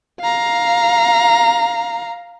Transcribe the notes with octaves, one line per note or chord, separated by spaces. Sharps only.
F5 A#5